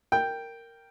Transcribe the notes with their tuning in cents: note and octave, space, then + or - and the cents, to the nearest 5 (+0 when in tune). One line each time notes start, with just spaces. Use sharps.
A#4 -10 G5 +0